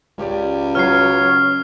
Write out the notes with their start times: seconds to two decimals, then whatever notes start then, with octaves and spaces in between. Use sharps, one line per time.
0.18 C#2 C#4 G4 D5
0.75 F#3 B4 C#5 F6 C7
1.19 C#4